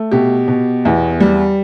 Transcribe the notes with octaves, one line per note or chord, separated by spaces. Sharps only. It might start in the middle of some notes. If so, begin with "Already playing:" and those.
Already playing: A3
B2 G4
B2
E2
G3